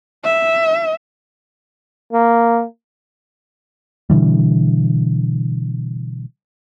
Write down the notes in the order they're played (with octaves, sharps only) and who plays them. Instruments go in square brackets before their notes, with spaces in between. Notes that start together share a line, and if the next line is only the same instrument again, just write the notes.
[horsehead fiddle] E5
[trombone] A#3
[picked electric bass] B2 D3 E3 G3